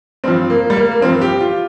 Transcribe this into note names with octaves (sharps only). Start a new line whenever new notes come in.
G2 F3 C4
A#3
G3
A#3
A#3
G2 F3 C4
G4
F4